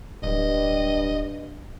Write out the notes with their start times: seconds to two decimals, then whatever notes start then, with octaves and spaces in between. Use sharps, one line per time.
0.23 D1 G2 D#5